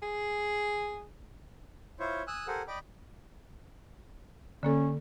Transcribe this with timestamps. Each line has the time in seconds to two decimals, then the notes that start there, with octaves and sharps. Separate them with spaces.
0.02 G#4
2.00 E4 F4 C5 C#5
2.27 G#5 D#6 E6 F#6
2.48 G4 A4 A#4 C5 F#5 G#5
2.68 D5 D#5 G5 B5 D6
4.63 D3 A#3 C#4 A4